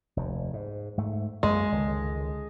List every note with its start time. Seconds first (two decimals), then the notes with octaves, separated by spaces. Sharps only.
0.17 F1 D#2
0.53 G#2
0.97 G#2 A3
1.43 F#2 G#3 A#3
1.72 C#2 D3 D#3